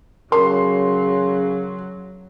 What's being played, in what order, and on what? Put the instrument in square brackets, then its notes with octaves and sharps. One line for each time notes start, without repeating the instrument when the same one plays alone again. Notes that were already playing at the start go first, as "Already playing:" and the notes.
[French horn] C#3 [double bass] F#3 [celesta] A#4 [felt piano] C6